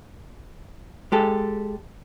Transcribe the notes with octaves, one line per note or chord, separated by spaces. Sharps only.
G#3 G4 A4